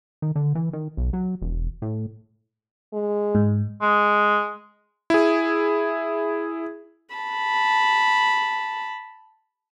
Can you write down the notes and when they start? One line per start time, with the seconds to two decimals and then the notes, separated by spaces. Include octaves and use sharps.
0.22 D#3
0.36 D3
0.55 E3
0.73 D#3
0.97 B1
1.13 F#3
1.42 E1
1.82 A2
2.93 G#3
3.35 G#2
3.82 G#3
5.10 E4 G#4
7.15 A5 B5